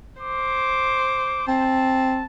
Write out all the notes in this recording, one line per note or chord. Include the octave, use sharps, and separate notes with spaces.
C5 D6
C4 A5